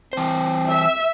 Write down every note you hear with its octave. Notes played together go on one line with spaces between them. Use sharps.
E3 C4 C5
E5